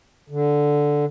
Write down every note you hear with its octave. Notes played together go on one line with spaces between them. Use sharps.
D3